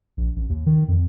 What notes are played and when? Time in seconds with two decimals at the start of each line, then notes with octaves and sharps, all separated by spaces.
0.17 A#1
0.36 A1
0.49 D#2
0.66 D#3
0.88 F2